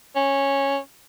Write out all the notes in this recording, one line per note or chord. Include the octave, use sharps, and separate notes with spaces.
C#4